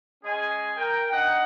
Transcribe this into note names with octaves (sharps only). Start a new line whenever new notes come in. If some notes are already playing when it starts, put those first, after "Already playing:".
G#3 C#4 G#4 D#5 G#5
A#4 G5
D4 D#4 D#5 F#5